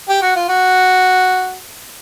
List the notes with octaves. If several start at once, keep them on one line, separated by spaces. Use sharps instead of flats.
G4
F#4
F4
F#4